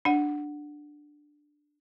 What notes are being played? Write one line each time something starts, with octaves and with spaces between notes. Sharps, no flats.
D4 F#5